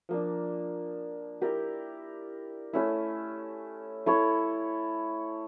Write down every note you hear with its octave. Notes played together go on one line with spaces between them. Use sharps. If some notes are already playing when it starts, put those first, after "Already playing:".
F3 A#3 D4
E4 G4 A#4 D5
A3 C#4 E4
E4 A4 C#5